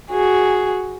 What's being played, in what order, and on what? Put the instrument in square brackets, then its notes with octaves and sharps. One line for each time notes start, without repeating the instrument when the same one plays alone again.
[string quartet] F#4 G#4